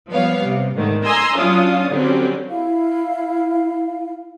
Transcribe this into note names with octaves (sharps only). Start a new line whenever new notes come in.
F3 G3 B3 C#5 F5
C3
G#2 D3 D#3 A3
G#5 A#5 C6 D#6 E6
F#3 C#4 D4 F4 F5 D#6
D3 F#3 G3 C4 C#4
E4 F5